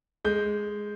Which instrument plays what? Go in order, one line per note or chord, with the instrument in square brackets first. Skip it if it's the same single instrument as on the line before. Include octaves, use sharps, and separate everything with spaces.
[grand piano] G#3 G6